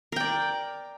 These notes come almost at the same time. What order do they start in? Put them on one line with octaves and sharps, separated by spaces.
A#4 G5 D5